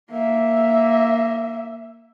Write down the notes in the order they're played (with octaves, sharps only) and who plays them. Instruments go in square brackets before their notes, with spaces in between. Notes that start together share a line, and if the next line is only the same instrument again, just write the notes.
[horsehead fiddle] A#3 E5